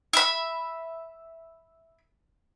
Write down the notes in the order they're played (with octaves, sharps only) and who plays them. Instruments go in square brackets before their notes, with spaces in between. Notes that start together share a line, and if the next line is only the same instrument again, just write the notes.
[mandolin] E5 B5